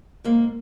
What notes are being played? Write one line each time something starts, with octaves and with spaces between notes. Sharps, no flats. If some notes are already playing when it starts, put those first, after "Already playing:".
G#2 A#3